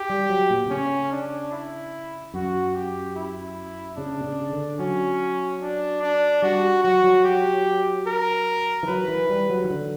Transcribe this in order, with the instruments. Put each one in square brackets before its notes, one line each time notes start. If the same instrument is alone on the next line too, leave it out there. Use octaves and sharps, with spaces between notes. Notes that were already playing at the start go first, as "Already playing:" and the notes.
Already playing: [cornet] G4
[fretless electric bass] G3
F#3
A#2
B2
[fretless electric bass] C#3 [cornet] C#4
[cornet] D4
E4
[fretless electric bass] F#2 [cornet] F#4
[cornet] G4
E4
[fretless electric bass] C#3 [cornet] D4
[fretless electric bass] B2
C#3
D3
[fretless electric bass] F#3 [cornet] C#4
[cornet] D4
D4
[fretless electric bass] G3 [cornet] F#4
[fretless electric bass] F#3 [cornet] F#4
[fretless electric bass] F#3
[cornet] G4
A#4
[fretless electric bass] E3
[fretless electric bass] F#3 [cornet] B4
[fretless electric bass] E3
G3
F#3
E3
D3